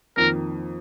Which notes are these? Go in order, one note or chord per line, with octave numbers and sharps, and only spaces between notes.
F2 D#3 A#3 A#4